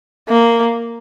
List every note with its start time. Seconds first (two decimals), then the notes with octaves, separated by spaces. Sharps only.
0.29 A#3